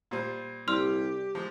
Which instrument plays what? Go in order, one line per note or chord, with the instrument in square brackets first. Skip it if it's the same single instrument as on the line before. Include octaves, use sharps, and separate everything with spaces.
[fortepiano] A#2 G3 C5
[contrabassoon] C2 [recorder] G4 [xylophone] C6 E6 F6
[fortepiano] F3 G#3